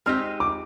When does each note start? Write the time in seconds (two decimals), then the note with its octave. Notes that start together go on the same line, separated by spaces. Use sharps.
0.06 G#3 C4 D#4 G4 F6
0.40 D6